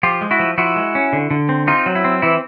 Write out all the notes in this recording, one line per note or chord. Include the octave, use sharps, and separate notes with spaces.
F3 F4 G4
G#3
E4 F#4
F3
F3 E4 F#4
G#3
C#4
D3
D3
C4
C4 D#4 F4
F#3
E4
C4
E3 E4